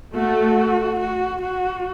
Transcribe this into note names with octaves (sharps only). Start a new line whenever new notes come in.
A3 F#4
F#4
F#4